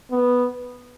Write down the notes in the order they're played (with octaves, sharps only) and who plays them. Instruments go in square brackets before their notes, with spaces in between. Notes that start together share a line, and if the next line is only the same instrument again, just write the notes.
[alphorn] B3